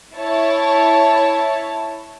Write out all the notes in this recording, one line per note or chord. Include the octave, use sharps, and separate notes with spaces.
E4 C#5 A5